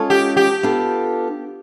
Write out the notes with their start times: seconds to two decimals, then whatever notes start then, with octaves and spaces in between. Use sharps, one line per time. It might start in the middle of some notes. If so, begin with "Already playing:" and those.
Already playing: G#3 C#4 F4 A4 C#5
0.10 G4
0.37 G4
0.63 B3 D4 F4 A4